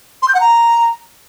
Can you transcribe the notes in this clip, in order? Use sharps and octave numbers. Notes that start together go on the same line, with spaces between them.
C6
G6
F#5
A#5